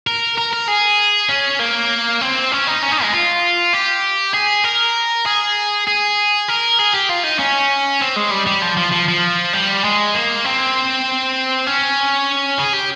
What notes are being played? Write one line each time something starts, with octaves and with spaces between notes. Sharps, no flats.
A#4
A#4
A#4
G#4
C#4
A#3
C4
C#4
D#4
C#4
D#4
G#3
F4
G4
G#4
A#4
G#4
G#4
A#4
G#4
G4
F4
D#4
C#4
C4
G#3
G3
G3
F3
F3
F3
F3
G3
G#3
A#3
C4
C#4
G#4
G4